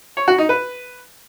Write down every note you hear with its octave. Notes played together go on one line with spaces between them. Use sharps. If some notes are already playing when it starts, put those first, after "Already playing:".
C#5
F#4
D#4
B4